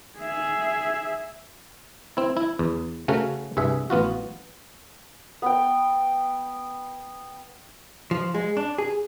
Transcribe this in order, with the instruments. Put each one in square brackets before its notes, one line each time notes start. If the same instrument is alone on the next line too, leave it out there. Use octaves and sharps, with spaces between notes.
[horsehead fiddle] G#4 E5
[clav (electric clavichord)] C4 E4
E4
E2
C#3 A3 C#4 F#4 A#4
C2 G2 G#4 E5
A1 B3 F4 F#4
[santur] B3 G5
[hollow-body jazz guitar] F3
G#3
D4
G#4